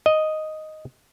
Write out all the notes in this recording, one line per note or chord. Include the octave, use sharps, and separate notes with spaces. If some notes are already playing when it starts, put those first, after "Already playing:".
D#5